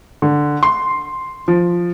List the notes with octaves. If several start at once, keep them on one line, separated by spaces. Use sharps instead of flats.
D3
C6
F3